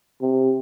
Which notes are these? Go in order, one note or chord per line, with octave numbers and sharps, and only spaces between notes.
C3